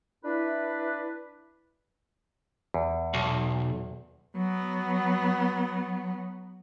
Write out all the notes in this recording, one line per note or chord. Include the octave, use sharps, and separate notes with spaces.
D4 E4 B4
E2
B1
F#3 B3